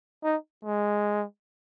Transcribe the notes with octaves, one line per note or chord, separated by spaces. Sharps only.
D#4
G#3